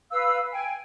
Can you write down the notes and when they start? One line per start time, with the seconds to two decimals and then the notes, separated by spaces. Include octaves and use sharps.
0.11 B4 F5 E6
0.51 G5 G#5